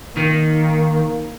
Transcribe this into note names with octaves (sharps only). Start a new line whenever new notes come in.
D#3 A#3